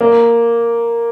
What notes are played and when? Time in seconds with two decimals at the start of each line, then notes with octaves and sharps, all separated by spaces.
0.01 A#3